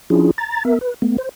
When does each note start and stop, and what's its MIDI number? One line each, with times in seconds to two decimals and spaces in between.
0.10 0.31 53
0.10 0.31 61
0.10 0.31 62
0.10 0.31 64
0.10 0.31 65
0.10 0.31 68
0.38 0.64 82
0.38 0.64 93
0.65 0.79 59
0.65 0.79 70
0.65 0.79 76
0.81 0.94 71
1.02 1.17 57
1.02 1.17 59
1.18 1.29 72